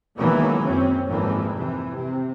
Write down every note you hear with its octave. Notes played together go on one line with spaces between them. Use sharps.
C#2 B2 D#3 E3 F#3 A#3
F#2 C4 C#4
G#1 F2 G#2 E3 A#3
C3 E3
C3